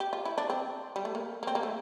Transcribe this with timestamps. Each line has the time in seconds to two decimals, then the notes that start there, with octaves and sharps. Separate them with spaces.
0.00 G4
0.13 F4
0.25 E4
0.38 D4
0.50 C4
0.96 G3
1.05 A3
1.15 A#3
1.43 A#3
1.47 C4
1.55 A#3
1.63 A3